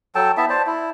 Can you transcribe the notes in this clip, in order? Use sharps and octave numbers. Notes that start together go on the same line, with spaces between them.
F#3 A4 G5 A5
B3 E4 E5 A5
C5 D5 A5
E4